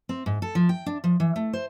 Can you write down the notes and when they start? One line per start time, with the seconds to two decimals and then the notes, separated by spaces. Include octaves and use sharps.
0.09 C4
0.26 G#2
0.42 A4
0.55 F3
0.69 G5
0.86 D4
1.04 F3
1.20 E3
1.36 A3
1.53 C5